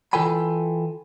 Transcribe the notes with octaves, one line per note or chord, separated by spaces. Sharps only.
E3 F4 A4 G5 G#5 B5